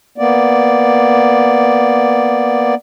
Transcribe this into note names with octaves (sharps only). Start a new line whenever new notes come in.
A#3 B3 D5